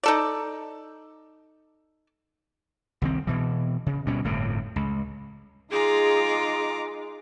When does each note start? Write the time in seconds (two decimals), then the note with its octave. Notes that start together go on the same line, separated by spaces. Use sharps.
0.03 D#4 A4 D5
3.02 C2 D#3 C4
3.27 B2 E3
3.86 C#3
4.06 D2 B2 G3 C#4
4.24 G1 F2 A2 C3
4.76 C#2
5.71 G#3 D#4 F4 G#4 A#5 D6